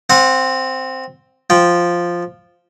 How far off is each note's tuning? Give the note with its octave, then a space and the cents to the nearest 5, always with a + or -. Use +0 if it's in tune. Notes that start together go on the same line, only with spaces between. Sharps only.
C4 +0 F#5 -30
F3 +0 G5 +0